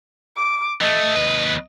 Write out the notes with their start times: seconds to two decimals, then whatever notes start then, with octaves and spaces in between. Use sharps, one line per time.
0.36 D6
0.81 E3 A3 D#5
1.16 D#2 B4